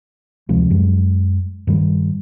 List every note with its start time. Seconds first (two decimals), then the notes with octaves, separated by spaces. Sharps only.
0.49 D2 C3 F3 G#3
0.70 F#2 G#3
1.67 G2 D#3 G3